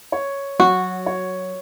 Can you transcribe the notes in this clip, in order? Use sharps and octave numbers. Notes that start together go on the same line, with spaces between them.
C#5
F#3 F#4
C#5